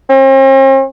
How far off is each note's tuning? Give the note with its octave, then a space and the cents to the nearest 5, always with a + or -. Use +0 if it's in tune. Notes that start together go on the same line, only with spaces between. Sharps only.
C4 +45